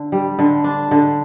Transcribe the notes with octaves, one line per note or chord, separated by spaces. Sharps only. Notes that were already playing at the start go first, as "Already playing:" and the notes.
Already playing: D3
G3
D3
D4
D3